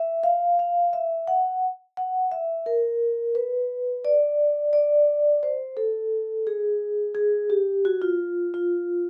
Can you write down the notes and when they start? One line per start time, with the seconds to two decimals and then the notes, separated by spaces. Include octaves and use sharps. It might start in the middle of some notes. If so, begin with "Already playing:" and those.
Already playing: E5
0.24 F5
0.59 F5
0.93 E5
1.28 F#5
1.97 F#5
2.32 E5
2.66 A#4
3.35 B4
4.05 D5
4.73 D5
5.43 C5
5.77 A4
6.47 G#4
7.15 G#4
7.50 G4
7.85 F#4
8.02 F4
8.54 F4